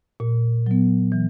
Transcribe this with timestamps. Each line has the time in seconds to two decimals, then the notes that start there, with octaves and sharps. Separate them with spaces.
0.20 A#2
0.66 F#3 B3
1.12 E3